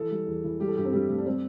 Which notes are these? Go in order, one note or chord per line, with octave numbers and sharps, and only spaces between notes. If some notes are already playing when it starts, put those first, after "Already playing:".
Already playing: E3 A4
G3
E2
E3
G3 G4
A4
G2 G4
C4
G2 G3
G2 A3
D4
G3 C4